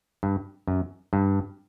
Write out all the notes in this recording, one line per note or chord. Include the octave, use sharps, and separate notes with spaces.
G2
F#2
G2